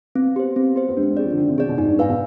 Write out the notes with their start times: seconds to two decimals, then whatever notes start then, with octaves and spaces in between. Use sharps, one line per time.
0.15 B3 C4
0.36 G4 C5
0.56 C4
0.76 G4 C5
0.89 B3
0.97 G#3 D4
1.11 C4
1.17 G#4 D5
1.24 F3
1.32 D3
1.38 D#3 D4
1.48 C3
1.58 B2 G#4 D5
1.69 B2
1.78 G#2 D#4
1.88 G2
1.99 G#2 B4 F5 G#5
2.09 B2